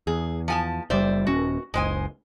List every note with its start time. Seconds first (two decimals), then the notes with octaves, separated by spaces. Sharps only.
0.07 E2 G#4
0.48 F3 G#5 A5
0.90 F#1 G3 C5 D5 E5
1.27 D#1 C#4 F#4
1.74 F#1 C#2 G#3 C5 G#5